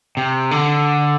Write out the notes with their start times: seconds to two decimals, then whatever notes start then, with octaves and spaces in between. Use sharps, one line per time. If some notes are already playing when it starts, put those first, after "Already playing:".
0.17 C3
0.51 D3